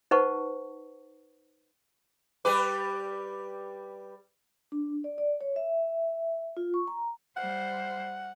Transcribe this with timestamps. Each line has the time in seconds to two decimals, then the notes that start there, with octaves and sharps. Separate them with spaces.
0.11 D#4 B4 C5 F#5 A5 C#6
2.45 G3 G4 B4 D6
4.72 D4
5.04 D5
5.18 D5
5.41 C#5
5.56 E5
6.57 F4
6.74 C#6
6.87 A#5
7.37 G3 C5 F#5